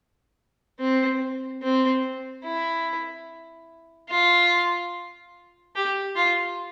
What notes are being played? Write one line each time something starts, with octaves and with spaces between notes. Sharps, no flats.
C4
C4
E4
F4
G4
F4